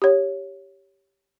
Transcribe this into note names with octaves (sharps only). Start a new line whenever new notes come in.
G4 C#5